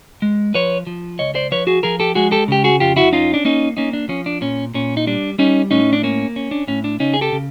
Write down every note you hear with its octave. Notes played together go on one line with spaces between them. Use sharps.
G#3
F3 B4 C#5
F3
C#2 C#5 D#5
C5 D5
F3 B4 C#5
F#4 G#4
F3 G#4 A#4
G4 A4
G#3 F#4 G#4
G4 A4
C#3 G4
F#4 G#4
F2 F4 G4
E4 F#4
C#4 D#4 F4
D4
A#3 C#4 D#4
A#3 C#4 D#4
D4
F3 C#4
D4
A#2 C#4
A#2 C#4
D#4
G3 D4
G3 C#4 D#4
A2 C#4 D#4
D4
A#3 C#4
C#4
D4
A2 C#4
D4
C#3 C#4 D#4
G#4
G4 A4
C#3